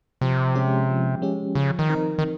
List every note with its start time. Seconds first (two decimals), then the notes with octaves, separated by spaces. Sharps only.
0.21 C3 F3
0.55 G#3 C#4 G4
0.89 F3
1.22 G#3 C#4 G4
1.55 C#3 F3
1.79 D#3
1.89 C4 D#4 A#4
2.19 D#3